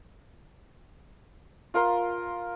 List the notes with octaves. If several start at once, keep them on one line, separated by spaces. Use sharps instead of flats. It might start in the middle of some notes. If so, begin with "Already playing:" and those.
F4 A#4 C6